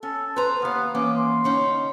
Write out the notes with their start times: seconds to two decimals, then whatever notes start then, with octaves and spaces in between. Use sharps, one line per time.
0.03 C#4 A4
0.36 B4 C5 A#5
0.62 D#2 B3 F5
0.94 E3 A#3 C#4 D6
1.17 C6
1.44 D3 C#4 D#4